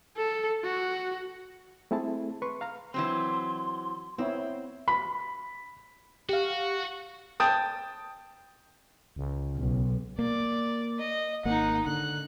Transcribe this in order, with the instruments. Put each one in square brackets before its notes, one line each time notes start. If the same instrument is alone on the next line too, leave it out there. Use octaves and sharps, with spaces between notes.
[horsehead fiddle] A4
F#4
[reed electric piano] A3 C4 E4 G#4 A5
B4 C6 C#6
F5 A#5 F6
[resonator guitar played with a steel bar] E3 F#3 C4 [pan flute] C6
[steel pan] B3 E4 C#5 [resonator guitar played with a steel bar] C4
[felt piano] B5
[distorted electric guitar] F#4 [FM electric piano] G4 F5
[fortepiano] G5 A5 D#6
[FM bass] C#2
[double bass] B1
[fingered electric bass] A#3 [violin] D5
[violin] D#5
[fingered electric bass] G#1 A#3 [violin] D#4 F#5
[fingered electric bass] D3 [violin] F#6